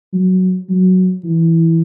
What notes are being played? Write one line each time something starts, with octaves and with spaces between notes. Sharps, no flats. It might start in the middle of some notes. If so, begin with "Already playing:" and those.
F#3
F#3
E3